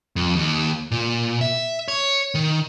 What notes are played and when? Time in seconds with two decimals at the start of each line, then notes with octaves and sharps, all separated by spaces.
0.16 F2
0.36 D#2
0.91 A#2
1.41 E5
1.88 C#5
2.35 D#3